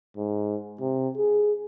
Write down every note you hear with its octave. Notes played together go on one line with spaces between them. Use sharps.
G#2
C3
G#4